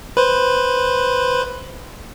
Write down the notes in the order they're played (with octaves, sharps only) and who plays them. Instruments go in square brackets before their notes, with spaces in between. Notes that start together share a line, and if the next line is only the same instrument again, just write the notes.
[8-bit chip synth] B4 C5